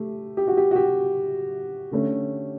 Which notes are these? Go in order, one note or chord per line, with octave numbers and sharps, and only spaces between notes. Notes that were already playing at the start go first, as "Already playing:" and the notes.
Already playing: A3 G4
G4
F#4
G4
F#4
G4
D3 A3 C#4